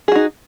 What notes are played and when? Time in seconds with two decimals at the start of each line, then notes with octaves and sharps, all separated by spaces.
0.08 G#4
0.12 F#4
0.16 D#4